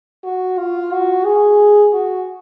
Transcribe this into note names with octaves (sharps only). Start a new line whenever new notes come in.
F#4
F4
F#4
G#4
F#4